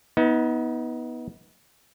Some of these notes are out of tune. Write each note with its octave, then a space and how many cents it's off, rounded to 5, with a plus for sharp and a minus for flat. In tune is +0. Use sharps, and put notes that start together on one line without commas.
B3 -10 D#4 +35